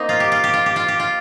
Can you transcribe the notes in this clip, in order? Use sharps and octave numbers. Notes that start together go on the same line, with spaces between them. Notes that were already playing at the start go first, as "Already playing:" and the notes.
Already playing: A#3 C4 D#4
F4
G4
F4
G4
F4
G4
F4
G4
F4